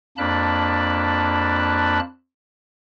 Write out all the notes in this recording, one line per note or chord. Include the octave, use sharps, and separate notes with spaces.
F2 A#3 D4 A5 B5 F#6